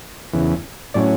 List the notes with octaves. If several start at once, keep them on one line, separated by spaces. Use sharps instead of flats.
E2 C#3 E3
A2 F#3 C#4 D5